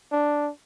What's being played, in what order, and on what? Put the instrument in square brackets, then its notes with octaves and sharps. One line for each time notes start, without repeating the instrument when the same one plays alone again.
[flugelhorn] D4